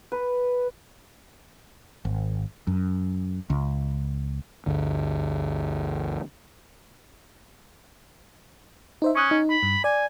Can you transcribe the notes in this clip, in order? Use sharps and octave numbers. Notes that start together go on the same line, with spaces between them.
B4
G#1
F#2
C#2
G1 D2
D#4 C5 E5
C#4 C#6 D#6 F#6
D#4
B5
G2
D5 G#5